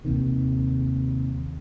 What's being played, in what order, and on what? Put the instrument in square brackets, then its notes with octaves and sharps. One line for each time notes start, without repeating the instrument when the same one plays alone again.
[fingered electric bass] D#2 C3 D#3